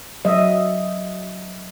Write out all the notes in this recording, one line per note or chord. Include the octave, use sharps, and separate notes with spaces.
F#3 D#5 E5